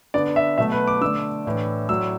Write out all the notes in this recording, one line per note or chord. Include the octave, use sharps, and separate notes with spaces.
D3 B3 D4 D5
E5
B2 F#3 A3 E5
B4
D6
D3 A3 D4 E6
A2 E3 D4
A2 F#3 D4 E6